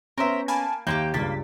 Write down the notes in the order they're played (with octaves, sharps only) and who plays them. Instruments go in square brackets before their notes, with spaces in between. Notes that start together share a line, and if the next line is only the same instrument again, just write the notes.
[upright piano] B3 C#4 [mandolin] A#4 C5 E5
[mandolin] A#3 [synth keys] G#5 A5 B5
[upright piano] D#2 [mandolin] A#3 E4 G4 [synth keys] G6
[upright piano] C#2 G2 [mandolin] A#3 [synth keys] A6 B6